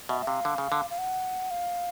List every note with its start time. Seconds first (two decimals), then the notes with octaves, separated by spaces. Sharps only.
0.09 B2 E5
0.21 E5
0.27 C3 F5
0.45 D3
0.58 C#3
0.72 D3
0.90 F5
0.98 F#5
1.51 F5